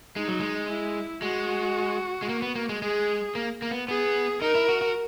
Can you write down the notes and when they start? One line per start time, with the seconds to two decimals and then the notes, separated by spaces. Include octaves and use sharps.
0.16 G#3 D#4
0.28 F#3
0.40 G#3
0.69 E4
1.22 G#3 F#4
2.22 G#3
2.29 A#3
2.42 B3
2.56 A#3
2.69 G#3
2.82 G#3 G#4
3.35 A#3
3.62 A#3
3.71 B3
3.88 B3 G#4
4.42 D#4 A#4
4.55 E4
4.69 F#4
4.82 F#4